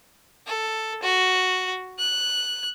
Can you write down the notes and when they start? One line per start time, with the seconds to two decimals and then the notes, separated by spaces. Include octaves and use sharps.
0.47 A4
1.03 F#4
1.99 F#6